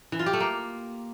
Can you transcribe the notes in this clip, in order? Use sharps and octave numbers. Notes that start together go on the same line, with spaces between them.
E3
F4
G4
A3
A#3